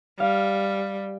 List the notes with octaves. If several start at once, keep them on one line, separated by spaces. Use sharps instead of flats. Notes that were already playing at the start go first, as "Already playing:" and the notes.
G3 F5